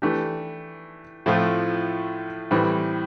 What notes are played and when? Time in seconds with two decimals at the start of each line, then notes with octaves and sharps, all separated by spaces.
0.02 E3 A3 D4 G4
1.26 A2 F3 A3 C4 F4
2.51 A2 E3 G3 C4